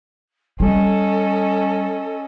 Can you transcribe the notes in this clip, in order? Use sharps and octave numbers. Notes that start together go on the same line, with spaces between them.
G3 C#4 A4 D#5